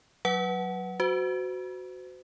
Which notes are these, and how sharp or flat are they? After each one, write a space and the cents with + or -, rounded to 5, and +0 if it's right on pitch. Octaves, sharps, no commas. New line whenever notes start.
F#3 +0 B4 +0 F#5 +10
F#4 +0 C5 -40